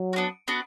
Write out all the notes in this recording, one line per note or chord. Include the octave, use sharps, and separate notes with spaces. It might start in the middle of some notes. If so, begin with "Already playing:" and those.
Already playing: F#3
F#4
B3 D4
B3 D4 F#4